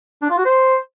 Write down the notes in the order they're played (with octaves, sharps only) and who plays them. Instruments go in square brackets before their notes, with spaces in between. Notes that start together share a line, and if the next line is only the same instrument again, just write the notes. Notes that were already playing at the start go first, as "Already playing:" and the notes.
[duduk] D4
F4
F#4
C5